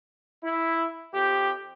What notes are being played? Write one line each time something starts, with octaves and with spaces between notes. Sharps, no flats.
E4
F2 G4